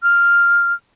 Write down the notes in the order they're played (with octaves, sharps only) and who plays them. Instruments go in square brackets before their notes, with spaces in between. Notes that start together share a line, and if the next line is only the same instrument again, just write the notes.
[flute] F6